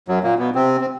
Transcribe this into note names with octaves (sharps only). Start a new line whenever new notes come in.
F#2 F#3
A#2 A#3
B2 B3
C3 C4
C4